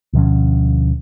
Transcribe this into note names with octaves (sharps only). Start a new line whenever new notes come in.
D2 B2 F3 C#4